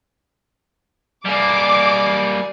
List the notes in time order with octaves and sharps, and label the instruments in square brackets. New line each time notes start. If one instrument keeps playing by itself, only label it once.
[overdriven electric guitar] G3 A#3 [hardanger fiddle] G#4 D5 [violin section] D6